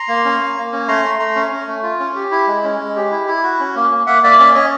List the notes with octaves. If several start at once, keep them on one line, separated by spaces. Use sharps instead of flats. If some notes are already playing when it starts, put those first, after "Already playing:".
Already playing: A#5 C6
A#3
C#4
A#3
A#3
C#4
A3 A#5 C6
A3
A3 A#5 C6
C#4
C#4
A3
F4
C#4
G4
E4
G#3
C#4
G#3
G4
E4
E4
F#4
C#4
A#3
A#3
A#3 E5 F#5
A#3 D5 E5
C#4 D5 E5
C#4 C#5 D#5